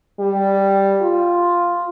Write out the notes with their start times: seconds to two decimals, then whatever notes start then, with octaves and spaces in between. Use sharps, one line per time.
0.20 G3
1.02 F4